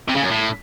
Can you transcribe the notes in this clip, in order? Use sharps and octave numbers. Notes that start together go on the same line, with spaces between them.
C3
C#3
F#2
A2